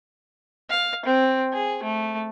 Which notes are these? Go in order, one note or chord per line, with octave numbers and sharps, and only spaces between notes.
F5
C4
G#4
A3